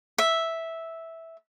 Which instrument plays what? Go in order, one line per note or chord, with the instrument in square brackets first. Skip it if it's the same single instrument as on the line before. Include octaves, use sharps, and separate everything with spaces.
[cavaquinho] E5